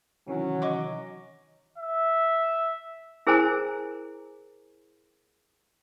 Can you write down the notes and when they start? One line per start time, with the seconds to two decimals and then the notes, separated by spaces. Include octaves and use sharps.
0.28 C3 D#3 E3 F#3 C#4
0.62 D#5 C#6 D6
1.78 E5
3.27 E4 G#4 A#4 C5 G#5 A#5